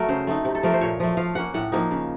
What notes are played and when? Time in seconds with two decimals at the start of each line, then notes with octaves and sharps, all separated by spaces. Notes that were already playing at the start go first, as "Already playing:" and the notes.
Already playing: F#3 A3 A#4
0.09 C#3 C5
0.27 A3 C4 D#4
0.45 C3
0.55 A4
0.63 F3 A3 A#4
0.73 C5
0.81 A#2 C#5
1.00 F3 A3
1.17 F3 F5
1.35 A#3 C#4 F#5
1.54 A2 F#5
1.72 F3 A#3 D#4
1.91 C#3